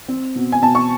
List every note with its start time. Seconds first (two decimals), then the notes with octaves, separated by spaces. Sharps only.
0.08 C4
0.35 B2
0.52 G#5
0.62 B2 A5
0.75 C#6